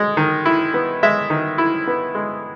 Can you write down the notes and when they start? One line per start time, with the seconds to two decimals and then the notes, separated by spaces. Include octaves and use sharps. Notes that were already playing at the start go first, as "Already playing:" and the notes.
Already playing: G#3
0.17 D#3
0.46 E4
0.74 B3
1.03 G#3 E5
1.30 D#3
1.58 E4
1.87 B3
2.15 G#3